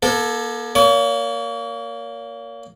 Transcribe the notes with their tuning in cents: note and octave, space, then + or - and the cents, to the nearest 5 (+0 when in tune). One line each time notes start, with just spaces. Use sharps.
A#3 +35 A4 -5
A#3 +0 C#5 +40